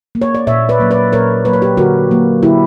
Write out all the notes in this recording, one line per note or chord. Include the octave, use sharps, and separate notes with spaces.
A#3
C#5
D5
A#2 C#5 E5
B4 D5
F#3 A#3
B4 D5
A#2 A#4 C#5
F#3 A#3 B4
C#5
G4 B4
D3 F#4 A#4
F#3 A#3
D3 E4 G4